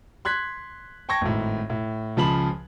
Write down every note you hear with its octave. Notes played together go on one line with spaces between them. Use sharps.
C6 F#6 G#6 B6
G5 A5 C#6 G#6 A#6
G#1 A2
A2
C#2 C#3 F3 A5 B5 F#7